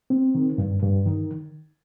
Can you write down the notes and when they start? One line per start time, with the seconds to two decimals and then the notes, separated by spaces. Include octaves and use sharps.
0.10 C4
0.35 D#3
0.58 G2
0.83 G2
1.06 D#3